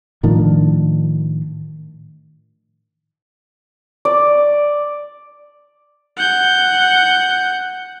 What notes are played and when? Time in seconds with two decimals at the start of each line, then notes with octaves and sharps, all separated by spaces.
0.23 A2 D#3 F3 D4
4.05 D5
6.16 F#5 G6